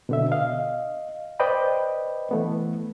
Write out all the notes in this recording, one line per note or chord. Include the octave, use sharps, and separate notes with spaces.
B2 D3 E5
D#5 F5
B4 C5 D5 D#5 G5 B5
E3 A3 B3